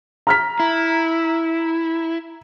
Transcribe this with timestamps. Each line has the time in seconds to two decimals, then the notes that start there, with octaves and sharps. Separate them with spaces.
0.27 A#5 F6 B6
0.60 E4